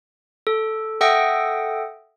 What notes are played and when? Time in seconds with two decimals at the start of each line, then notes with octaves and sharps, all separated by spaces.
0.47 A4
1.01 A4 E5 F#5 G5 D#6 A#6